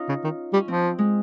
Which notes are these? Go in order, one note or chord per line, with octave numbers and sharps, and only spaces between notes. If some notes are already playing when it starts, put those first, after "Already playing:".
Already playing: C#4 D#4 F4
C#3
D#3
G3 C#4
F3 C4
G#3